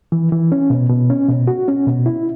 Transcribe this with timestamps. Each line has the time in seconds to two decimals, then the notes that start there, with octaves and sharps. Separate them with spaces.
0.12 E3
0.32 E3
0.52 C#4
0.70 B2
0.90 B2
1.10 C#4
1.28 B2
1.47 F#4
1.68 C#4
1.87 B2
2.06 E4